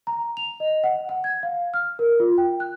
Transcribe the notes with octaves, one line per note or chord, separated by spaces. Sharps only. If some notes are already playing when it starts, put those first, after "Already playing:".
A#5
F7
D#5
F#5
F#5
G#6
F5
F6
A#4
F4
G5
F#6